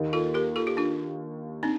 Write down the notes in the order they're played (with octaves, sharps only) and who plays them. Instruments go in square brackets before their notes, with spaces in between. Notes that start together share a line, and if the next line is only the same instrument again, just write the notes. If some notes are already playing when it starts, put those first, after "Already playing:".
Already playing: [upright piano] D#2 D#3 A#3 D#4
[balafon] F4 A4
G4 A#4
F4 A4
G4
D4 F4
[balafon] C4 D#4 [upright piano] D4